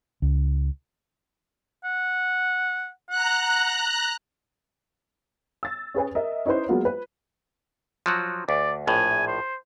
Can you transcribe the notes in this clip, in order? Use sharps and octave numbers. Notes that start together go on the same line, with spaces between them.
C#2
F#5
F#5 A#5 F#6
E6 A6
C#4 G#4 B4 G#5
A#4 D#5 E5
C#4 D#4 E4 B4 C5
F#3 G#3 A#3 B3 F4 F#4
B4
F3 F#3 F#4
D2 D5
A#1 A2 G#5
C5